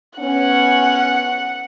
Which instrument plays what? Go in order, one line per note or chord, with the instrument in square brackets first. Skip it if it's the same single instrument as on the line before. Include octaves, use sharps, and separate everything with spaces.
[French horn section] B3 C#4 [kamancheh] F#5